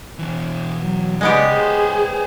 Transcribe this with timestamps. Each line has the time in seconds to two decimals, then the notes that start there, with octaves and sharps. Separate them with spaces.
0.19 B2 E3
0.80 F#3
1.21 C#3 G#3 B3 G4 D5
1.51 G#4 B4 C5